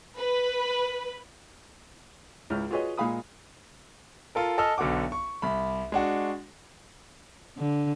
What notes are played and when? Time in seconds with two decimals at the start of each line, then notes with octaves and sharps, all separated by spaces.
0.18 B4
2.50 C#2 G#2 E4 F6
2.71 F4 F#4 G#4 B4 C#5 D#5
2.97 A#2 G#3 F5 B5 D#6
4.35 F4 A4 A#4
4.58 A4 D#5 G#5 E6 F6
4.78 B1 D3 B3 F#4 D6
5.12 C#6
5.42 C2 B5
5.92 G#3 D4 F#4
7.57 D3